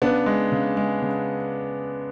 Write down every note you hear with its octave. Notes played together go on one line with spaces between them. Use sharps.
C#3 B3 D4
G#3
C#3
G#3
C#3